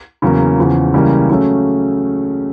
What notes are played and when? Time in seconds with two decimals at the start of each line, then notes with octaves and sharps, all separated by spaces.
0.22 E2 C#3 F#3 A#3
0.58 E2 C#3 F3
0.94 C#2 C#3 E3 G3 A#3
1.30 C#3 F#3 A3 C#4